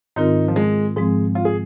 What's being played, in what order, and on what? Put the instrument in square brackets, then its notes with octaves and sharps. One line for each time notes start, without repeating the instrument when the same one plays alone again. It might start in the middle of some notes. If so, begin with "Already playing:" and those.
[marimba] G#2 D#3 C4 F4 A#4 [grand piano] D#4
[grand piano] F3
G#3
[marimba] G#2 F3 G#3 C4 [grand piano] G#4
[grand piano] F4
G#4